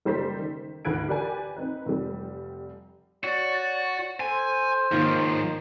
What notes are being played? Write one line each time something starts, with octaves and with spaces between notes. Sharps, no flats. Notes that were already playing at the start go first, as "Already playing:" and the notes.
F#1 G3 A4 C5 A#5 B6
D#3
D2 G#2 B4 G#6 D7
G4 A#4 B4 D5 G5 G#5
C4 D#4 B4
F1 G3
F#4 C#5 D5
A4 C5 G#5
G#2 D#3 F3 A#3 F4 C#5